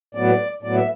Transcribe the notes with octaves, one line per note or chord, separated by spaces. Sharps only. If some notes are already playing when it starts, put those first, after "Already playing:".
A2 F#3 B3 D5
A2 F#3 B3 D5
E5